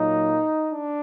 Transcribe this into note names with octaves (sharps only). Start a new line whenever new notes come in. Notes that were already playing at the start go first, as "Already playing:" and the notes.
Already playing: A#2 F#3 A#3 D#4
D4